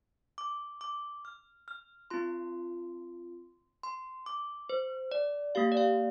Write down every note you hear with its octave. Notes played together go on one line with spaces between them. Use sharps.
D6
D6
F6
F6
C4 F4 C6
C6
D6
C5
D5
A#3 G4 F5
D5
F5